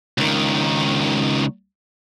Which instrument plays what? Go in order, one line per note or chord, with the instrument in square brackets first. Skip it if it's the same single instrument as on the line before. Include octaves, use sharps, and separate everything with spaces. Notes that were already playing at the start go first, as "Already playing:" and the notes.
[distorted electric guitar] C#2 D#3